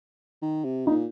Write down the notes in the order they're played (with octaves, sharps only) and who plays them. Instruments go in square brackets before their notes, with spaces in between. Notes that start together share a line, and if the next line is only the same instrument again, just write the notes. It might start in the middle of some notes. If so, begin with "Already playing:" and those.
[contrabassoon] D#3
C3
[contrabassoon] A#2 [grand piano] D#4